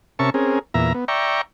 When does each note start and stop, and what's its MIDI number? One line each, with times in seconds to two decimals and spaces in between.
0.19 0.30 48
0.19 0.30 61
0.19 0.30 70
0.19 0.30 76
0.19 0.30 81
0.19 0.30 85
0.34 0.59 60
0.34 0.59 61
0.34 0.59 68
0.34 0.59 70
0.74 0.93 40
0.74 0.93 46
0.74 0.93 76
0.74 0.93 82
0.94 1.05 59
1.08 1.41 74
1.08 1.41 76
1.08 1.41 79
1.08 1.41 82
1.08 1.41 85